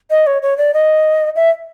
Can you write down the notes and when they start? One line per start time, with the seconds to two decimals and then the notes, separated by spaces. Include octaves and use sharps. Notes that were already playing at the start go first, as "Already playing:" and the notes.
0.11 D#5
0.27 C#5
0.42 C#5
0.58 D5
0.74 D#5
1.36 E5